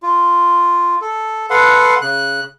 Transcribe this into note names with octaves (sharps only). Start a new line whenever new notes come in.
F4
A4
A4 B4 F5 F#5 C6
C#3 F#6